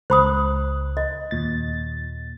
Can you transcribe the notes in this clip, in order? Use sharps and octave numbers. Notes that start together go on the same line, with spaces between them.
C#2 C5 B5 D#6 F#6
D#5
D#2 A#2 A6